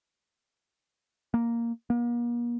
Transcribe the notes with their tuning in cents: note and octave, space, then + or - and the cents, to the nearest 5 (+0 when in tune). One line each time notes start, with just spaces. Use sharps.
A#3 +0
A#3 +40